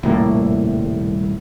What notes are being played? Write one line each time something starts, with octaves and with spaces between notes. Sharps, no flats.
D#1 C2 A2 A#3